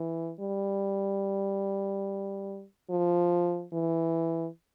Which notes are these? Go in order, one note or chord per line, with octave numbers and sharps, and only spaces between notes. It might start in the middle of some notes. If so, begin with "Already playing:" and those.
Already playing: E3
G3
F3
E3